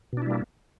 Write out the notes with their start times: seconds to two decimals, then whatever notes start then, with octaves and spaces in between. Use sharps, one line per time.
0.13 B2
0.17 D4
0.22 E4
0.26 G3
0.31 A#3